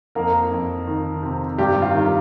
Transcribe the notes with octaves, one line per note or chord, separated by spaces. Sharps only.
F2 A#3 A#4
F2
D#3
C3
G2 G3 G4
F4
D#3